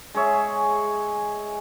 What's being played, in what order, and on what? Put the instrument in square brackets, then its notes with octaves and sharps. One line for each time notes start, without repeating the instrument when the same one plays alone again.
[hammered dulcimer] G#3 G#4 C#5 E5